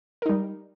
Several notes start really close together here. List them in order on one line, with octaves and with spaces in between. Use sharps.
A#4 D#4 G3